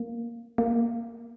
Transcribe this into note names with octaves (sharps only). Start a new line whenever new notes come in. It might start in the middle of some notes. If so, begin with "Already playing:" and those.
Already playing: A#3
A#3